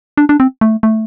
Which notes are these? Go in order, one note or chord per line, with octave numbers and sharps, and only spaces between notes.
D4
D4
C4
A3
A3